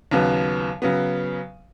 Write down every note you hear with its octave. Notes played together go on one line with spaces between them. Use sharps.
D#2 C#3 F#3 B3
C#3 F#3 B3